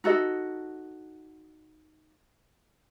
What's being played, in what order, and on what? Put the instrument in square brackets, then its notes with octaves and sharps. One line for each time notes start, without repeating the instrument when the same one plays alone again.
[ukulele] D#4 F#4 A4 D#5